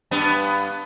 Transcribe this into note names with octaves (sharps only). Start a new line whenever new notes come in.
G2 B3